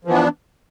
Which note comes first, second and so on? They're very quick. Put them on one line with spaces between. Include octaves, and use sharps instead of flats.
F3 E3 B3 D4